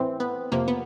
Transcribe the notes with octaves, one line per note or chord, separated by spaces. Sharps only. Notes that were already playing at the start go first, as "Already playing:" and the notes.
Already playing: A2 E3 C4
B3
F2 C3 F3 A#3
B3